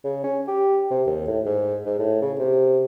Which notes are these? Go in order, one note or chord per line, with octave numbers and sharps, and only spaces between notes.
C#3
C#4
G4
C3
D#2
A2
G#2
G#2
A2
C#3
C3